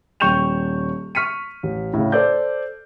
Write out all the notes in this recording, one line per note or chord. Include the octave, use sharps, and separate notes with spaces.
D#1 G5 C#6 G6 E7 F7
C#6 F6 B6 C#7 D#7
A1
A2 C#3
A4 C5 D5 D6 G6